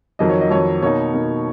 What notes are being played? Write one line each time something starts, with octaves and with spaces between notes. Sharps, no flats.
F2 D#3 F#3 D#5
C#5
D#5
F2 D#3 F#3 C#5
B2 A#3 D#4 C#5
B2 A#3 D#4